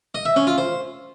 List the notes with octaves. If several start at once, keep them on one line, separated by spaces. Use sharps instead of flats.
D#5
E5
C#4
F4
C5